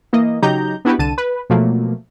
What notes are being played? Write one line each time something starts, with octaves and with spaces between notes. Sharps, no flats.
E3 A#3 D#5
C#3 F#3 D#4 G4 A#5 G6
B3 D4 E4 F#4 G4 B4
C2 D3 A5 D#7
B4
B2 F3 F#3 A3 A#3